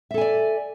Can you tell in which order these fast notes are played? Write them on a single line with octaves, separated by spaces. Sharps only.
E5 A4 G#5 D5